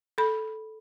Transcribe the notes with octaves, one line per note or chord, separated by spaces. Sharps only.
A4 B5